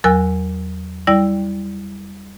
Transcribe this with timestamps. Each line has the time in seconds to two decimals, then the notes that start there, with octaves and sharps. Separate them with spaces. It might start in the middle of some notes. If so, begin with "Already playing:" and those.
0.04 E2 F#3 A#4 G#5 E6 F#6
1.07 G3 E4 D5 G5 E6